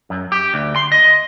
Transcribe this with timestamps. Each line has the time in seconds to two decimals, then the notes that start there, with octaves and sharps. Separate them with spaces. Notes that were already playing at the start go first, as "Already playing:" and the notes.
0.10 F#2
0.32 G4
0.54 D2
0.76 C6
0.92 D#5